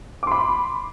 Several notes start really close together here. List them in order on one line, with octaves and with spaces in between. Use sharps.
D6 C6 B5